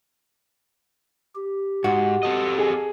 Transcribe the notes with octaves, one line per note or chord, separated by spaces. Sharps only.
G4
G#2 F#4
C4 A4 D#5
G#4